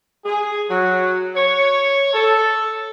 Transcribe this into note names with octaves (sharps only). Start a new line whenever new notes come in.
G#4
F#3
C#5
A4